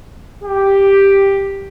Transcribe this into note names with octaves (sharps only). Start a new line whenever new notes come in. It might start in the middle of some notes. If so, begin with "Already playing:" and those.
G4